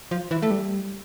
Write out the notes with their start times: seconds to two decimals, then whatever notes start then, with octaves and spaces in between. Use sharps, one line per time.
0.11 F3
0.31 E3
0.42 A3
0.51 G3